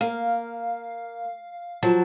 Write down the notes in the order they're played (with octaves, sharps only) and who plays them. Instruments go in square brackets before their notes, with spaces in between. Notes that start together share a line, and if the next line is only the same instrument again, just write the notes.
[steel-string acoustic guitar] A#3 [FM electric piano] F5
[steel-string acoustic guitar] F3 F#3 [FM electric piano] A5